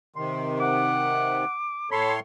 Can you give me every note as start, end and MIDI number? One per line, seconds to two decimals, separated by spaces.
0.16 1.45 48
0.16 1.45 51
0.16 0.57 84
0.60 1.53 78
0.60 1.87 86
1.91 2.20 45
1.91 2.16 69
1.91 2.20 73
1.91 2.13 83
1.91 2.20 84